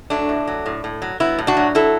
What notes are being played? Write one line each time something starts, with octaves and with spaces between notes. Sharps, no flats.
F#3 A3 D4
A2
F#3
A2
A2
F#3
F#3 B3 E4
A2
D4 F#4
F#3
F#3 E4 A4